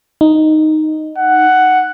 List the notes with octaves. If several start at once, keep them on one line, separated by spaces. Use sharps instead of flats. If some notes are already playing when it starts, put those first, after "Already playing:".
D#4
F#5